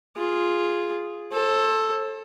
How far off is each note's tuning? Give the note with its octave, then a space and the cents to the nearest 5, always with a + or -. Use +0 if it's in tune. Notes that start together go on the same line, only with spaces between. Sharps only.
F4 +0 G#4 +0
A4 +0 C5 +40